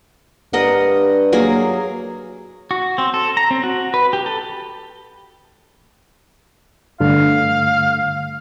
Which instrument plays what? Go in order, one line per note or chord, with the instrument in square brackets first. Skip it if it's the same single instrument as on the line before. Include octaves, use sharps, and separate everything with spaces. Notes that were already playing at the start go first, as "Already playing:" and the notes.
[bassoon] G2 [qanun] A#4 D#5 F#5
[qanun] F#3 A#3 G#4
[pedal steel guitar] F#4
C4
A4
A#5
C4
F#4
B4
G4
A4
[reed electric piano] G2 D3 A3 [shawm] F5